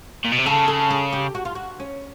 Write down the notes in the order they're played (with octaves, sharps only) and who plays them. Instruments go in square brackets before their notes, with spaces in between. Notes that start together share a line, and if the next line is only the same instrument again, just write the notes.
[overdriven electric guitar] A#2
B2
C3
[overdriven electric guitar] C#3 [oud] A4
[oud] A4
G#4
G4
F#4
F4
F#4
C#4